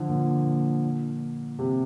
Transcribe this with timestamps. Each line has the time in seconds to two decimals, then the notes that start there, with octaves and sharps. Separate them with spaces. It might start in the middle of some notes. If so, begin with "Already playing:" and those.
Already playing: D3 F3
0.08 A#2
1.59 C3